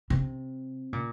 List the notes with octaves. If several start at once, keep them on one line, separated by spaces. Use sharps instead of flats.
C3
A#2